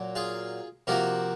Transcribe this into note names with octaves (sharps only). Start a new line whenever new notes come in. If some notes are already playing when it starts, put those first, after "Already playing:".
Already playing: A#2 F#3 A#3
F4 G#4
C3 F3 A#3 F#4 A#4